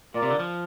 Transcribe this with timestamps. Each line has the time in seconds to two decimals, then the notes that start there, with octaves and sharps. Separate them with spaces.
0.14 A#2 F4 A#4 D5
0.22 C3
0.30 D3
0.39 F3